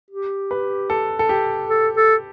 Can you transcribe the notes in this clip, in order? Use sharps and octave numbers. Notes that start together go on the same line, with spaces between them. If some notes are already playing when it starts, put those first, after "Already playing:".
G4
B4
A4
A4
G4
A4
A4